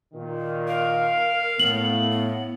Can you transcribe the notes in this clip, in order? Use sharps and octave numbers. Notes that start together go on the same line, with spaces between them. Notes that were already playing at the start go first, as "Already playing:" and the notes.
A#2 D#3
A#4 F5
A2 B3 F#7
B3